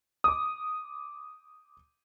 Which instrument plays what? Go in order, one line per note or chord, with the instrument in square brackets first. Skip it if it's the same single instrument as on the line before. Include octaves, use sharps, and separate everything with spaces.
[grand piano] D6 D#6